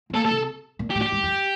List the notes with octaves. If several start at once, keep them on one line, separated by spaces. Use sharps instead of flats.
C4
A#3 A4
A4
C3
A#2
G4
A2
G4
G2
F2